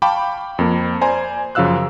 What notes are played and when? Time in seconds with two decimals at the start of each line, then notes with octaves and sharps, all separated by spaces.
0.02 F5 G5 A5 B5 C#6 D6
0.59 F2 A#3
1.01 C5 D5 G#5 A#5 C6
1.55 F#2 C#3 F3 F5 E6 F#6